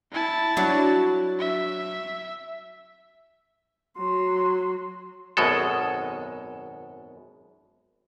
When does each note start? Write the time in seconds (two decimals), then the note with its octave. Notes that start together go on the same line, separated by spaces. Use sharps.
0.12 E4 A5
0.57 F#3 D4
1.39 E5
3.97 F#3 C6
5.37 G#1 F#2 B2 G#3 A4